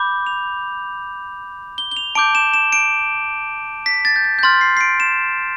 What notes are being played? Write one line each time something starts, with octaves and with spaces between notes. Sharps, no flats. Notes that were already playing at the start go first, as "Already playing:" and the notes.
Already playing: B5 D6 G6
F7
G7
G7
F7
A5 D6 G6 D7
E7
E7
D7
B6
A6
G6
A6
G6
C6 F6 A6
C7
C7
D7
E7